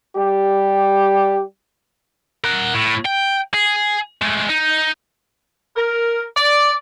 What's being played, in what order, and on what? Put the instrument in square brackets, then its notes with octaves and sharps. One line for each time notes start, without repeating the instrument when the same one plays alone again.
[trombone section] G3 G4
[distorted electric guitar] A#4 F#5
A2
G5
G#4
G#3 A3
D#4
[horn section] A#4
D5